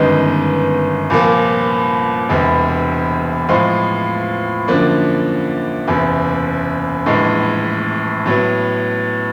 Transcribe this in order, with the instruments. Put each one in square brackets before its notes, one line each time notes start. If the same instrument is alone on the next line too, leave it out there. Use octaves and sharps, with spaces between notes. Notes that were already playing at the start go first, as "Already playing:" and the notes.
Already playing: [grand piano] G1 F#2 D#3 G#3 B3
C2 A#2 F3 A#3
E1 E2 C3
A2 F3 G#3 C4 F4
F#2 D3 F3 A#3 D4
F#1 E2 C3
A#1 A2 E3 G#3
A2 F#3 B3